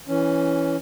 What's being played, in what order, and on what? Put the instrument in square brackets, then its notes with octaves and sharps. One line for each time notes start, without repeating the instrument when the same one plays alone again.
[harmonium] E3 C#4